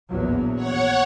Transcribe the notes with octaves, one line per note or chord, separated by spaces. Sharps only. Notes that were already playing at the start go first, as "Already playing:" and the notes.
A#1 E2 F#3
C#5 F#5